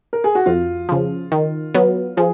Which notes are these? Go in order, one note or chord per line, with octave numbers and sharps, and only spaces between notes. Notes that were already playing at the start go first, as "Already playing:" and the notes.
A#4
G#4
F#4
F2 F4
C#3 F3
D#3
F#3 B3
F3 G#4